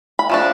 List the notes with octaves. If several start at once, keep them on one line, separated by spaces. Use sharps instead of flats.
B5
F3 A3 D4